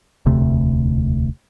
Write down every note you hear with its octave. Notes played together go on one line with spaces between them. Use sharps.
E1 D2 C3 A3